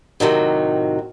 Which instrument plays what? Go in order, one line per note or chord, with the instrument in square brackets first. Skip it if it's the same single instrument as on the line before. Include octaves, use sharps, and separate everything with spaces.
[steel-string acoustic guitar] A2 C3 D#3 F#3